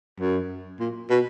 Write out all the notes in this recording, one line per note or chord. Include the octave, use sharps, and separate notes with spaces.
F#2
A#2
B2